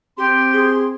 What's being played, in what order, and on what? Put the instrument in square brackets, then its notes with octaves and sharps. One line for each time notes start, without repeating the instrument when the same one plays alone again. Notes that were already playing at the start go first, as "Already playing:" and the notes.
[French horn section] C4 [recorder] G4 [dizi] C6
[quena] G#4